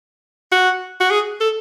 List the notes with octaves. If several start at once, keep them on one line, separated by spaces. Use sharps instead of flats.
F#4
F#4
G#4
A4